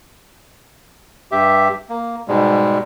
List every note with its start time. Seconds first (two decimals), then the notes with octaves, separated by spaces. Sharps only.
1.32 G2 G4 E5
1.90 A#3
2.28 G#2 B2 G3 G#3